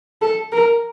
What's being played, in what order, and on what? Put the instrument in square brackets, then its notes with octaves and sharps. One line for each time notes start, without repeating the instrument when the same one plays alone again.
[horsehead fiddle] A4
A#4